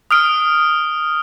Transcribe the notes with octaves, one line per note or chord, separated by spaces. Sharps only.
D#6 F6 D7